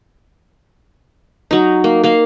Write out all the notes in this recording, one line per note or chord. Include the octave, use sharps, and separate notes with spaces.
F#3 D#4
A#3
A#3 F5